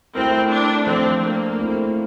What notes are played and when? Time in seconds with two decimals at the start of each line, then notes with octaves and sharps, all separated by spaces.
0.15 A3 C4 E4 A#4
0.50 D4
0.86 F3 A3 C4 D4 A4 C5
1.23 A#3
1.59 A3 C4 E4